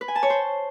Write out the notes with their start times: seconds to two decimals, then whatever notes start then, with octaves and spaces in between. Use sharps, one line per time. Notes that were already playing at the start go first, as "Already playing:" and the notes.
0.01 B4
0.08 G#5
0.15 A5
0.23 C#5
0.30 C5